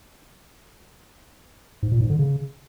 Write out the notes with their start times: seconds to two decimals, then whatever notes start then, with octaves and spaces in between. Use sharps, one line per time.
1.83 G#2
1.92 A#2
2.01 G#2
2.10 D3
2.19 C#3